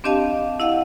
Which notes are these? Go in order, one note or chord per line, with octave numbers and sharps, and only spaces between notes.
C4 D4 G4 D#5 F5 A5
E4 D#5 F5 F#5